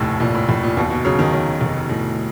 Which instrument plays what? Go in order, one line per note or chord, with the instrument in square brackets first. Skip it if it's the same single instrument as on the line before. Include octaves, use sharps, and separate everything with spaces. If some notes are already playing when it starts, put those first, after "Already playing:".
Already playing: [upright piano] F1 D#2 [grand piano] A2
[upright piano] F1 [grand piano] A#2
[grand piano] A2
[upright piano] F1 [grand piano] A2
[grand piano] A#2
[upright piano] D#2 [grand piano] B2
[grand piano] B2
[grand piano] C#3 [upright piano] F#3
[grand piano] D#3
[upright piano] F#3
F1
A2